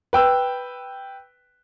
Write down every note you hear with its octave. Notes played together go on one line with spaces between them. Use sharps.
B4 G5 E6